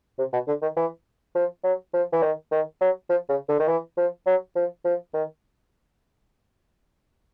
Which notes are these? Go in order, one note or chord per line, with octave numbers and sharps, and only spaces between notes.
C3
B2
D3
D#3
E3
F3
F#3
F3
E3
D#3
D#3
F#3
F3
C#3
D3
D#3
E3
F3
F#3
F3
F3
D#3